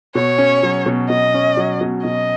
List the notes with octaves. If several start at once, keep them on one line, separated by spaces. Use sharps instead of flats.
B2 C#5
C#4
F#3
B2
B2 D#5
C#4
F#3
B2
B2 D#5